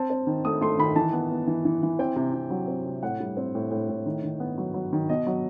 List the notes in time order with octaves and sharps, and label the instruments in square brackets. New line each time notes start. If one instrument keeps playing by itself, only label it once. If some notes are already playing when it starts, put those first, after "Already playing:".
Already playing: [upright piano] C4 A5
C4
D#3
A3 D#6
A3 C6
D#3 B5
E3 A5
B3
B3
E3
E3
E3
C4 G5
C3
C3
F#3
C4
C3
A2 F#5
G3
C4
A2
A2
A2
D#3
D#3
B3
F#3
F#3
D#3
B2 D#5
F#3